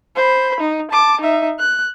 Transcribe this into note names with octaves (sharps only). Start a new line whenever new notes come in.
C5 B5
D#4
A5 D6
D#4 E5
F#6